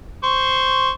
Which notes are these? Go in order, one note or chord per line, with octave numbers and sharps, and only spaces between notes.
C5 C#6